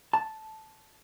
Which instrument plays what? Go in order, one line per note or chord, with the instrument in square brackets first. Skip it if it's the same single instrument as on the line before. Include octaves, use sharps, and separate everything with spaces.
[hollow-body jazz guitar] A5